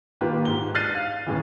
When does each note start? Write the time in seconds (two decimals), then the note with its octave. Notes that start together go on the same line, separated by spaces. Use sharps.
0.21 D#3 A#3 F4 G4 B4
0.45 G#2 G7
0.75 F6 F#6 A6 C7 D#7
0.95 F5
1.26 D#2 A2 C#3 E3